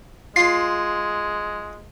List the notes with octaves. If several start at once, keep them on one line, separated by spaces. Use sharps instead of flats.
G#3 F4 C7